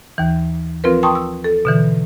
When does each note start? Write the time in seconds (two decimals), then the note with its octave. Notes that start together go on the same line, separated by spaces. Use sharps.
0.18 D#2 E3
0.84 F3 C4 F4 A#4 B4
1.03 G5 A5 C6 C#6 D#6
1.15 E6
1.44 A4
1.65 B2 D3 E3